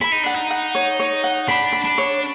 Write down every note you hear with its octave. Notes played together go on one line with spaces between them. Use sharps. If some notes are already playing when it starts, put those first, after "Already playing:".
E4 B5
D#4
D4 F#5
D#4
F#5
C#5
C#5
F#5
D4 B5
B5
D4
C#5